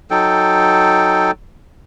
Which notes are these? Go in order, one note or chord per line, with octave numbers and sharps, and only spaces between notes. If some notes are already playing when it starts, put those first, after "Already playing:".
F#3 D#4 A4 G5